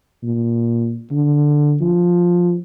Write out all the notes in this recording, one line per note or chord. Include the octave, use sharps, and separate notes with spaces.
A#2
D3
F3